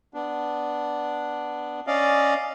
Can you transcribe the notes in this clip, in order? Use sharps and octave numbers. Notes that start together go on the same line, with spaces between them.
B3 D4
C#4 D5 D#5 F5